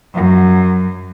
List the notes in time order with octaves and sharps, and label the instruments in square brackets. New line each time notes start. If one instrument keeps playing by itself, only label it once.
[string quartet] F#2